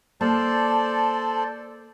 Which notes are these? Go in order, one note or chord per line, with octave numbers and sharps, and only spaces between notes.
A#3 A4 C5 D5 A5